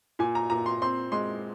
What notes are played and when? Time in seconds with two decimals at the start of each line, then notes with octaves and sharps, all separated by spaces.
0.19 A#2 G#5
0.35 A#5
0.50 A#2 A#5
0.66 C6
0.82 C4 C6
1.12 G#3 C6